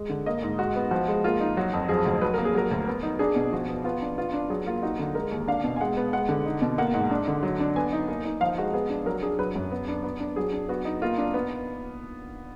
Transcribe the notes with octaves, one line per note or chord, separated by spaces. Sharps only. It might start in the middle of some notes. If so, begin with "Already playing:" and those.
Already playing: G#3
D3
A#3 D#5
G#2
G#3 F#4
B3
F3 F#4
G#3
A#3 F4
D#4
F#3 F#4
F2
F3 G#4
D2
F#3 B4
A#3 A#4
G#4
F#3 A#4
D2
B3
D#4
D4 G#4
B2
F3 F#4
B3
B3 F4
D4
B3 F4
D4
F#3 G#4
A#3 F4
D#4 F#4
D3
G#3 A#4
D#2
D4 F5
B2
G#5
G#3 F#5
B3
G#3 F#5
D3
D#4
B2
A#3 F#5
G#2 F#5
D4
D3
F#3
D4
B3 G#5
D#4
A#3
D#4
F3 F5
G#3 F#4
B3 G#4
D4
F#3 A#4
D4 G#4
F#3 B4
F#2
B3
D4
B3
D4
F#3 G#4
D4
B3 F#4
D#4
A#3 F4
D4
B3